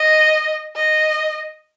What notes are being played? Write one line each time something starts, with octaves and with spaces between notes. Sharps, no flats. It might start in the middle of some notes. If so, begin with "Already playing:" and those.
Already playing: D#5
D#5